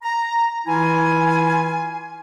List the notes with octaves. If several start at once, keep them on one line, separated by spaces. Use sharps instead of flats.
A#5
E3 E4 F4 G#5